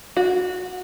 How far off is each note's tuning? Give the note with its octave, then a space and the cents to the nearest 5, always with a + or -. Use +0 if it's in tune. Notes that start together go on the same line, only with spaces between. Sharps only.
F#4 -20